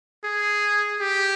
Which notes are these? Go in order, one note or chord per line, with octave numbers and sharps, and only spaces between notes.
G#4
G4